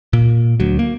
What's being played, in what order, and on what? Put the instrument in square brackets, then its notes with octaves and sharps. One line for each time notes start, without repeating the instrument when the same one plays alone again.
[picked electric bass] A#2 A#3
D2 F#3
A#3